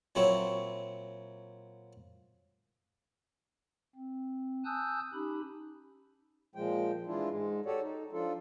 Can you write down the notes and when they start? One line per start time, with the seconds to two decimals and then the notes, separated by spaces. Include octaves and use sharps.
0.15 A#2 F#3 C4 E4 C#5
3.96 C4
4.65 G#5 A5 D#6 E6 F#6 G6
5.14 C#4 D#4 G4 B5
6.55 A#2 F3 G#3 G5
7.07 E3 G#3 D4 E4 F4
7.30 G#2 G#3
7.66 F#4 G4 A4 C#5 D5
7.81 D#4
8.12 F3 D4 F4 A4